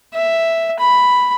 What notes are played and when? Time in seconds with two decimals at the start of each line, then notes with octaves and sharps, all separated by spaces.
0.14 E5
0.79 B5